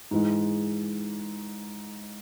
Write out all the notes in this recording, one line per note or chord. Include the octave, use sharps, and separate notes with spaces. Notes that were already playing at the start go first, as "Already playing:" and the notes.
G#2 E3 G#3